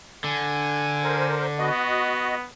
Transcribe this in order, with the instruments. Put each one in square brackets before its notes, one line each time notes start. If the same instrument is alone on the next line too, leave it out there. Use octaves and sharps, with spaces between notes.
[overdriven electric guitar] D3 [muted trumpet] G#5
[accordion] A#4 C5
[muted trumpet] B3 [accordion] F#4 D#5